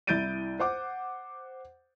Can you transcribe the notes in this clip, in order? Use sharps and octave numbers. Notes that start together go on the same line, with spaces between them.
C2 E4 G6 A6 D7 D#7
C5 F#5 D6